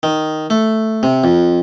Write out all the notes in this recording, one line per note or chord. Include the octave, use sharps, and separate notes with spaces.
D#3
A3
C3
F2